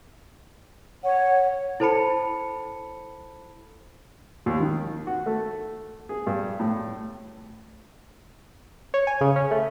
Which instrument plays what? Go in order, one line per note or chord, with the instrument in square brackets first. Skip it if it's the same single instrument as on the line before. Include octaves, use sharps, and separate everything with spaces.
[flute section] C#5 [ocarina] F#5
[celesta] E4 A4 C5 A5 B5 C#7
[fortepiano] D#2
D#3
F#4
A3
G#4
G2
A2
[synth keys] C#5
G#5
C#3
C#4
A3